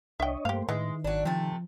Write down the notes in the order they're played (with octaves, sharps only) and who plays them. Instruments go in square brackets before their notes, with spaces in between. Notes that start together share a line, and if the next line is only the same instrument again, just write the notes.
[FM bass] C2 [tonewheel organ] D4 C#5 D#5 [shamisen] E5 G5
[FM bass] G2 [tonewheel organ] A3 A#3 C5 [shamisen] G4 F5
[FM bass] A2 [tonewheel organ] D#3 [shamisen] E3 [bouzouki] G#3
[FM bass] G#1 [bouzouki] F#3 D4
[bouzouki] C3 A3 [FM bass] F3